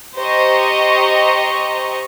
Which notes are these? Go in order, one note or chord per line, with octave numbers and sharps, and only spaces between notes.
G4 C5 D#5 A#5 C#6